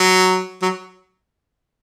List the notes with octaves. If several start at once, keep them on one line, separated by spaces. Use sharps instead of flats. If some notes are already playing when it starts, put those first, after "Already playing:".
Already playing: F#3
F#3